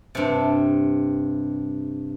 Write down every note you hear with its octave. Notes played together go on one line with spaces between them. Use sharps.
G2 C3